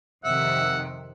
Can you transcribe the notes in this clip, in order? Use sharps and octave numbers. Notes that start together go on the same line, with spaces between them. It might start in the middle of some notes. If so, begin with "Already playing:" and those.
F2 C3 D#3 E5 F#5